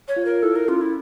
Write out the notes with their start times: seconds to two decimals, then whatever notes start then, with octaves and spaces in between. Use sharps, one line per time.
0.08 C#5
0.16 F4
0.25 A#4
0.42 E4 A4
0.56 A#4
0.68 C#4 F4
0.81 E4